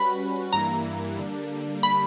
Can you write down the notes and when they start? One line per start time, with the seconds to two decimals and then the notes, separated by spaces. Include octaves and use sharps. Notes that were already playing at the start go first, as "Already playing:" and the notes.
Already playing: G3 C#4 F#4 B4 B5
0.53 G2 E3 G3 A#3 E4 A#5
1.18 D3 G3 A#3 D4
1.83 B5